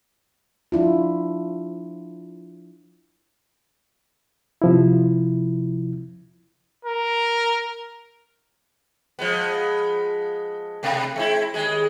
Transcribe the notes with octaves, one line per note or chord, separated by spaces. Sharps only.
F3 D4 E4 F4
C3 F3 E4
A#4
F3 G#3 B3
B2 A3
G#3 C4 E4
D#2 G#3 G#4